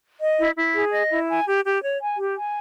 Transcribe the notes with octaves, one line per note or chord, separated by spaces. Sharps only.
D#5
E4
E4
G#4
D#5
E4
G#5
G4
G4
C#5
G#5
G4
G#5